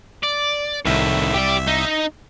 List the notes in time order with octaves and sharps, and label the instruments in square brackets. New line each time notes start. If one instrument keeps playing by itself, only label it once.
[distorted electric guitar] D5
[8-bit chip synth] C2 E5 [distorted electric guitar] A2 D#3
[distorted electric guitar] G4 D5
D#4